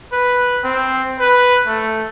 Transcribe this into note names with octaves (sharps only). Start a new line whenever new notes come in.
B4
C4
B4
A3